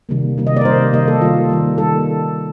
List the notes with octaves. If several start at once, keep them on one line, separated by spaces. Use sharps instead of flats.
C3 D#3 G3 A#3
C3 D#3 G3 A#3
D#5
D5
A#4
C3 D#3 G3 A#3 C5
C3 D#3 G3 A#3 D#5
A4
D#3 G3 A#3 F4
D#3 G3 A#3
D#3 G3 A#3 A4